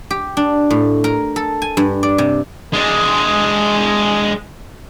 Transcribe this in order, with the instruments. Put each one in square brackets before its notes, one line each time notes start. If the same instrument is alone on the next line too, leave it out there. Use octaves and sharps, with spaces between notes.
[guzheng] G4
D4
A2
A#4
A4
G#5
G2
D5
C3
[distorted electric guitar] G#3 D4